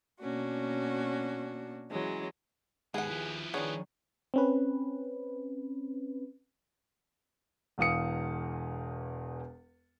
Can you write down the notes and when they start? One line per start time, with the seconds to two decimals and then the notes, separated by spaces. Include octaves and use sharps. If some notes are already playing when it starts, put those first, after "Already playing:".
0.21 B2 A#3 C#4 D4 F#4
1.90 E3 F#3 G#3 C#4
2.94 D#2 G#2 B3 G#4 F#5
3.09 F3 E4
3.54 D#3 B3 D4 G#4 C#5
4.34 C4 C#4 B4
7.78 E1 E2 F5 D#6 C#7